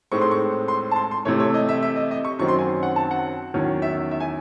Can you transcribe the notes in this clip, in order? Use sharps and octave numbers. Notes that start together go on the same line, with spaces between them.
A2 G#3 C4 D#4 C#6
C6
C#6
C6
A5
C6
C6
C3 E3 A3 C#5
C#5
D#5
E5
E5
D#5
D#5
C#6
F#2 D#3 F#3 C4 C#6
C6
G#5
F#5
A5
F#5
E2 D#3 F#3 C#4
E5
E5
G#5